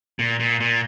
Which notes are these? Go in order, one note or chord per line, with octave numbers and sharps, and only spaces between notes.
A#2
A#2
A#2